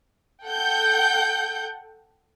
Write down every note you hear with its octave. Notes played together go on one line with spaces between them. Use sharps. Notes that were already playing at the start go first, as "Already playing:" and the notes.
A4 F#5 G5 G6